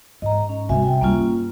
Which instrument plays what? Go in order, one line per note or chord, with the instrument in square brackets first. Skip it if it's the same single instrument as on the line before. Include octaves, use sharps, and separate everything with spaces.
[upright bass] G#2 [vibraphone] D#5 A#5
[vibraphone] C#4
[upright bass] C3 G3 [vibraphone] F#4 E5 G#5
[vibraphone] G5
[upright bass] G2 G3 [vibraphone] A#3 C#4 F4